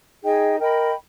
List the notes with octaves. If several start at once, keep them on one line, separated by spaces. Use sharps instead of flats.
D#4 G#4 D#5 G5
A#4 D#5 G5 B5